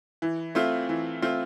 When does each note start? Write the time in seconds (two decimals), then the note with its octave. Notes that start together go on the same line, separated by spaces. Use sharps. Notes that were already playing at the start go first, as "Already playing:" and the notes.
0.22 E3
0.55 A3 C4 F4
0.89 E3
1.22 A3 C4 F4